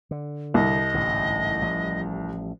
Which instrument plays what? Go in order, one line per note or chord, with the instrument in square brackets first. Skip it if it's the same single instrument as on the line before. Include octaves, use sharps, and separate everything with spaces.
[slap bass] D3
[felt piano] C2 [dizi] D#5
[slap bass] A1 G#2 D3
A1 F3 G3